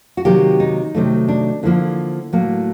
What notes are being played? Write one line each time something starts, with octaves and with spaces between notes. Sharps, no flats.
F#4
C3 D#3 F#3 A#3 G4
D#4
C3 D#3 F#3 A3
D4
D3 F3 A#3 E4
A2 F#3 A#3